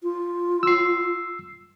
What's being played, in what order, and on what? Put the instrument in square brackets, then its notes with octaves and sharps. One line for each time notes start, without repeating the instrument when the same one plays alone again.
[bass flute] F4
[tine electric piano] E6 C7